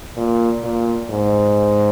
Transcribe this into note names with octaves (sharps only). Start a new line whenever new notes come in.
A#2
A#2
G#2